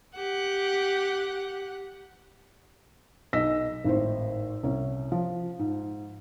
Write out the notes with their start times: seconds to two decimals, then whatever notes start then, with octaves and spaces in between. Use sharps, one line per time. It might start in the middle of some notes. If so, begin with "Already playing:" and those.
0.16 G4 F#5
3.33 B1 D#5 E6 A#6 B6
3.84 G#1 A2 C5
4.63 C2 C#4
5.12 F3
5.59 G#2